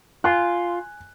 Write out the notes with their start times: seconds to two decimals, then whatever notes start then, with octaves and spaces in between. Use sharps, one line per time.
0.24 F4 G#5 F#6